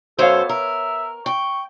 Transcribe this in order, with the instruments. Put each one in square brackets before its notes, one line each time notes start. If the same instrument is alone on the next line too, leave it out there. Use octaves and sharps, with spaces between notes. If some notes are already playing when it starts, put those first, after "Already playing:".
[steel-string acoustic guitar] F#2 C5 [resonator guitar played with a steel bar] B3 C#5 F5 [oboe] A4
[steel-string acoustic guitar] A#4 [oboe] E5
[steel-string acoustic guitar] G5 [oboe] C#6